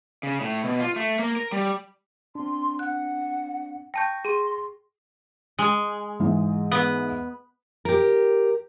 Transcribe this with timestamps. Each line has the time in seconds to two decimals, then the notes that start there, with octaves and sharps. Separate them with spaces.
0.23 C#3
0.41 A2
0.64 B2
0.80 F4
0.96 A3
1.19 A#3
1.36 A#4
1.52 G3
2.35 C4 D4 C6
2.79 F#5 F#6
3.94 G5 A5 C#6 G6 A#6
4.25 G#4 C6 D#7
5.59 G#3
6.20 G#2 E3
6.72 B3
7.85 G4 A#4